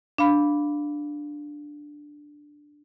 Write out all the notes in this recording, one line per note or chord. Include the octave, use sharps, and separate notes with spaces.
D4 F5 B5